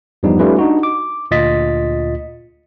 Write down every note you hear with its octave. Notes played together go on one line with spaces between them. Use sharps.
E2 G2 F3 G3 B3 D#4
G3 A3 C#4 D#4 F4 B4
D4 D#4 F#4
D6
D2 A#2 F4 D#5 A6 B6